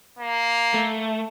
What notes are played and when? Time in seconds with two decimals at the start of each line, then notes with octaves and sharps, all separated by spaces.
0.19 A#3
0.74 A3